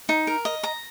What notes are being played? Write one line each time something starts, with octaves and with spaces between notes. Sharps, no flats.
D#4
A#4
D#5
A#5